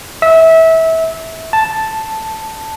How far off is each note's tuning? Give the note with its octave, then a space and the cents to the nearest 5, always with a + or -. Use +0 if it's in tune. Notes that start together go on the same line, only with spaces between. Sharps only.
E5 -25
A5 +0